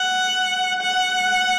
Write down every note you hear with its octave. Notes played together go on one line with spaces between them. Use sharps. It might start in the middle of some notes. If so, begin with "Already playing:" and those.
Already playing: F#5
F#5